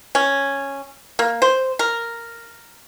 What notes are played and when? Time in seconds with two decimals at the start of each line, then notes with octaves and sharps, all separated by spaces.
0.15 C#4
1.19 A#3
1.42 C5
1.79 A#4